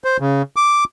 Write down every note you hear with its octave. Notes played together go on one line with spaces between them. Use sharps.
C5
C#3
D6